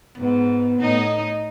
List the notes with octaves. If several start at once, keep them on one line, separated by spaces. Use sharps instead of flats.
G#2 B3
A2 D#4 D#5